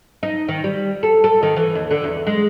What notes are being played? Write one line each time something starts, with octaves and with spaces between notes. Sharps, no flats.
D#4
D#3
G3
A4
A4
D#3
E3
D#2
D3
E2
G#3